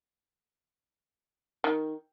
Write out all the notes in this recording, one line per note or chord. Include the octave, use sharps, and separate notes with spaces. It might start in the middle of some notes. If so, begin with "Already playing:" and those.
D#3